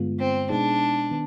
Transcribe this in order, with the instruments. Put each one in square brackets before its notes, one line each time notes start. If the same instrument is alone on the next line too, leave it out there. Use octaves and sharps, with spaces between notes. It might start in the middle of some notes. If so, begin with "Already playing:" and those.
Already playing: [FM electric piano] G2 D3 G#3 B3 F4
[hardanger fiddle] C4
[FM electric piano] B2 G#3 B3 D#4 G#4 [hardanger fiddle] D4
[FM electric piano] D#3 B3